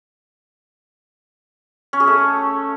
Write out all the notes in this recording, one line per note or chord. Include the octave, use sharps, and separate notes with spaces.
C#4
G#4
A3